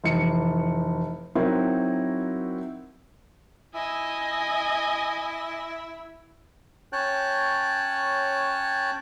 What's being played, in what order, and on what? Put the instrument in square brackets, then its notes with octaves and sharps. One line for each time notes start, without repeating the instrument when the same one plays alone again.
[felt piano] F1 E3 C#7
F#3 C4 D#4 E4 F#4 A#4
[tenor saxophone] E4 [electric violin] D#5 G#5
[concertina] C#4 C#5 G5 A5 F#6